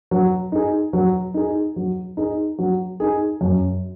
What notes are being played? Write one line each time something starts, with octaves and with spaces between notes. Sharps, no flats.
F#3
D#4 G#4
F#3
D#4 G#4
F#3
D#4 G#4
F#3
D#4 G#4
F#2